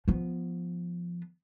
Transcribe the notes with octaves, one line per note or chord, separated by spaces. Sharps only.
F3 B3